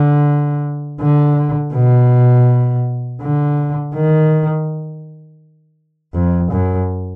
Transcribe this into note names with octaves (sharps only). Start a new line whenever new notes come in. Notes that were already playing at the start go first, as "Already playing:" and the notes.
Already playing: D3
D3
B2
D3
D#3
F2
F#2